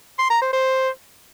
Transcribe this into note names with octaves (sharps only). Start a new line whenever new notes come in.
C6
A#5
C5
C5